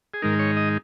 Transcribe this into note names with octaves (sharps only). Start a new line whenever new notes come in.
G#4
G#2 D#3 G#3 D#4 A#4
C#5
D#5